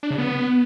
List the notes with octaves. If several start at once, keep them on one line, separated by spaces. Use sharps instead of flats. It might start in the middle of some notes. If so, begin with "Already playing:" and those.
D4
C#3
B3